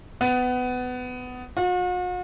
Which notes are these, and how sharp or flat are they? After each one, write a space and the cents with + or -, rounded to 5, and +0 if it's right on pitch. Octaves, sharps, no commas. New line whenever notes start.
B3 +20
F#4 -45